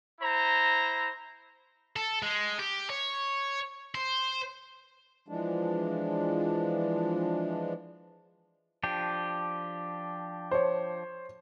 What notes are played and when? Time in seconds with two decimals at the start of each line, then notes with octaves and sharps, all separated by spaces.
0.21 E4 C5 A#5
1.96 A4
2.23 G#3
2.59 G4
2.90 C#5
3.95 C5
5.28 E3 F3 G#3 D4
8.83 F3 D4 G4
10.51 C5 C#5